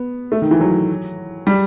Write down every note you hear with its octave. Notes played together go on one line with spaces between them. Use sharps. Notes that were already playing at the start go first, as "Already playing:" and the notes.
Already playing: B3
A3
D#3
E3
F#3
G3